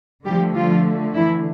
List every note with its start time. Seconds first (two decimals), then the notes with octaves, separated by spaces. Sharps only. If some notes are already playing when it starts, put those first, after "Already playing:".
0.25 D3 F3 G3 A3 G4
0.56 F3 F4
1.16 E3 E4